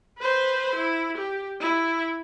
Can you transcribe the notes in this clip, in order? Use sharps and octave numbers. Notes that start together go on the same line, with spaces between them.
B4 C5
E4
G4
E4